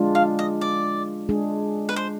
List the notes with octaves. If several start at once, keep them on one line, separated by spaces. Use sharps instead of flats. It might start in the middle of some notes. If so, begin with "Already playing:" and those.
Already playing: G#3 D4 F4
F5
D#5
D5
G#3 D4 G#4
B4
C5